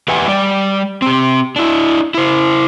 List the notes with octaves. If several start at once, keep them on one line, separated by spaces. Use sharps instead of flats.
E2 G4 B4 E5 F#5 G#5
G3 D5
C4 G4
D4 E4
E4 C5